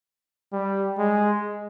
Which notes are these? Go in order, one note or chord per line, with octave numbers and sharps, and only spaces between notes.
G3
G#3